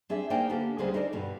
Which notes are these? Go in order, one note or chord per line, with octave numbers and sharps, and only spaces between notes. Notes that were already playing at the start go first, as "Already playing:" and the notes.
C4 D4 G#4 E5
A#3 D#4 C5 D5 G5 G#5
D3 A#3 B3 D4 G4 A4
D2 C#3 G3 G#3 G#4 C5
D4 D#4 A4 A#4 C#5 D5
G2 B2 D3 G3